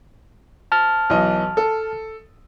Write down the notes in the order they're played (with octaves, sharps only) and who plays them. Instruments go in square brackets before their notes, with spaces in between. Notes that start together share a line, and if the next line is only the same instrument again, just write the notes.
[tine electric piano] A5 F6
[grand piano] B1 E3 D#5
A4